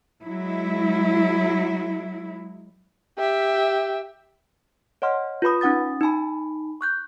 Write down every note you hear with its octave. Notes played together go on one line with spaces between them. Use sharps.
F#3 G#3 E4
G4 E5
C#5 D#5 F#5 C6 F6
F4 B4 B5 D#6
C#4 D#4 F#5 D#6 A6
D#4 G#5 A5 B5
C#6 F#6 G6